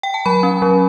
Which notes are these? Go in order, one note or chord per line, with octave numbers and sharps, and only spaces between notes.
G5
A5
F#3 B5
C#4
F#3